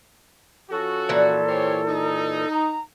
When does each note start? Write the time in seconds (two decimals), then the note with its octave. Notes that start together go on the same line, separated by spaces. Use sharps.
0.71 F3 C#4 F#4 A4
1.09 A#2 E3
1.48 G4 C5 C#5
1.87 D#4
2.52 A#5